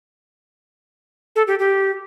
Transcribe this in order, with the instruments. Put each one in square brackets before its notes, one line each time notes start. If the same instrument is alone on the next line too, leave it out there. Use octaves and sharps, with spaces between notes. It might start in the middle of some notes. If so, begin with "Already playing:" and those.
[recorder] A4
G4
G4